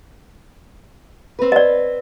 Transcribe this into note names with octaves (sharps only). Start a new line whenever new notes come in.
C4 B4
D5 D#5